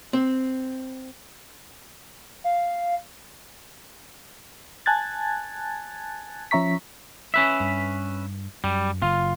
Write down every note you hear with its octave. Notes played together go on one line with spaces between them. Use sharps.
C4
F5
G#5 A5 F#6 G#6 A6
F3 C#4 E5 A#5 C#6 B6
C#4 B4 E5
G2
F#2 G3
F#1 F4